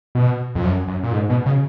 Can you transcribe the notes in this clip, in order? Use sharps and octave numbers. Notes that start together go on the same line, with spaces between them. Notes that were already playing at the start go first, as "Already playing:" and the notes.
B2
F2
F#2
F#2
A#2
G#2
B2
C#3